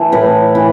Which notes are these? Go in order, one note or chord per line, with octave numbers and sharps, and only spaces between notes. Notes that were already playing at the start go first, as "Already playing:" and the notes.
Already playing: E3 A3
A2 B4
E3